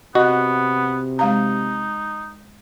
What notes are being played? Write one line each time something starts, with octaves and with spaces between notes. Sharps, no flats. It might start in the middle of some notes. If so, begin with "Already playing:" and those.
C3 B3 F#4 D#5 F#5
G#3 D#4 F5 A#5